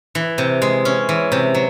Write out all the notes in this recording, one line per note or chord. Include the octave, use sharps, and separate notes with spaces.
E3
C3
G#3
C#4
E3
C3
F#3